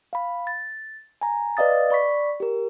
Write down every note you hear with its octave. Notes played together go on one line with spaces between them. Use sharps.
F5 B5
A6
G#5 A#5
B4 D5 D#5 F5 D#6 A6
D5 B5 C#6 B6
G4 A#4